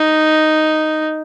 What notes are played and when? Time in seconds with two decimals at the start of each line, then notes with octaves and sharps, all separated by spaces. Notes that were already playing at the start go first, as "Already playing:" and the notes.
Already playing: D#4